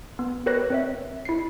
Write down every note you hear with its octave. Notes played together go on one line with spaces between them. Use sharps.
B3
G4 A#4 B4 C#5 F#6 A#6
C4 C#5 E5
E4 C7